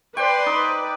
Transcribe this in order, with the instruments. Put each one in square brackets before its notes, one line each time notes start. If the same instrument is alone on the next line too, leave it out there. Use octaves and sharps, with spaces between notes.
[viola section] B4 D5 [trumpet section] C5 C6 [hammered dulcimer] G5
[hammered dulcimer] D#4